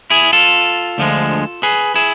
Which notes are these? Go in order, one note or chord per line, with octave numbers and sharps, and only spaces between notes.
E4 G#4
F4 A4
D2 D3 F3 G#3
G#4 B4
E4 G#4